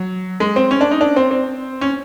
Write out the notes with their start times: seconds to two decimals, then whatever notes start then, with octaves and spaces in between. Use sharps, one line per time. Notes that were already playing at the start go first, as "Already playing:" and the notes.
Already playing: F#3
0.40 G#3
0.56 C4
0.71 C#4
0.81 D4
0.91 D#4
1.01 D4
1.16 C4
1.31 C4
1.81 C#4